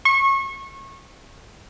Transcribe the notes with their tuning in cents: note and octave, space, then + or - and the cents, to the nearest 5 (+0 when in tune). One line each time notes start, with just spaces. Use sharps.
C#6 -30